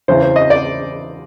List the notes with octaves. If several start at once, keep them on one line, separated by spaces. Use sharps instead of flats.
E2 C#3 E3 C5
C5
D#5
D5